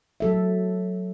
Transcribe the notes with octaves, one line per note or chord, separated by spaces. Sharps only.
F#3 A4 E5